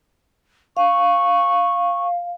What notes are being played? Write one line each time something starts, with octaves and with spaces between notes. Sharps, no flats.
F5 C#6